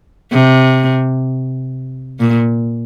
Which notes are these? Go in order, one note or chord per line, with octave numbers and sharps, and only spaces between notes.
C3
A#2